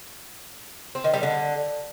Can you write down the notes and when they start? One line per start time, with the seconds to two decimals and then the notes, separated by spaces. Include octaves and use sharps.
0.95 C4
1.04 D#3
1.14 G3
1.23 D3